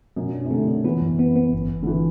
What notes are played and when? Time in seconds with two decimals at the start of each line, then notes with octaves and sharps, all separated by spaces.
0.16 F#2 B2
0.33 D4
0.45 C3
0.51 D3 A3
0.68 D4
0.84 E3 B3
1.02 F#2
1.19 B3
1.36 B3
1.53 G1
1.70 G1
1.83 D3
1.87 E3